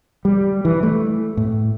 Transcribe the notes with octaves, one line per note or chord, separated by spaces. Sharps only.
G3
E3
A3
A2